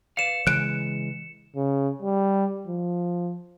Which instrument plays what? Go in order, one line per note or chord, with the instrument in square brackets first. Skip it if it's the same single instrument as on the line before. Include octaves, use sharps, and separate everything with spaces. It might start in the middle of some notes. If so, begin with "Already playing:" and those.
[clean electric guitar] B4 D5 F5 [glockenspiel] C#7 E7
[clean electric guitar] C#3 [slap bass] E3 G#3 [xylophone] F#6 D7
[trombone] C#3
G3
F3